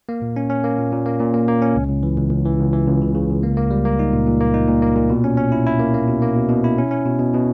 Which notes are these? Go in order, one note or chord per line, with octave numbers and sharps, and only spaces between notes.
A#3
A#2
C#4
C#4
A#3
A#2
A#2
A#3
A#2
A#3
A#3
C#4
C#2
C#2
E3
C#2
C#2
E3
C#2
E3
C#2
C#3
C#3
C#2
A#3
A#3
G3
A#3
D#4
A#2
A#2
A#3
D#4
A#2
A#3
A#2
B2
C#4
C#4
E4
E4
A#3
A#3
B2
A#3
B2
B2
E4
C#4
C#4
B2
B2
B2